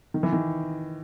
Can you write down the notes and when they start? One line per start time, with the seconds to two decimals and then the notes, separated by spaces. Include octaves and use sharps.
0.14 D#3
0.23 E3
0.32 D#3